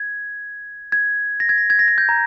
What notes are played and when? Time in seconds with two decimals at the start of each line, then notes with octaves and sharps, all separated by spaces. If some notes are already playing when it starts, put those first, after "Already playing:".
Already playing: G#6
0.92 G#6
1.40 A#6
1.49 G#6
1.58 A#6
1.70 G#6
1.79 A#6
1.88 G#6
1.98 G6
2.09 A#5